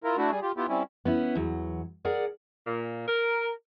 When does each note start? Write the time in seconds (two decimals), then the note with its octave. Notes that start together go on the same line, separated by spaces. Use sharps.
0.04 E4 F4 A#4
0.17 A3 D4 E4 F#4
0.31 G3 G#4
0.42 F4 G4
0.57 B3 E4 F4 G4
0.68 G3 C4 C#4 E4
1.05 B3 C#4 E4
1.35 E2 F#3
2.05 G#4 A#4 D5 F#5
2.66 A#2
3.08 A#4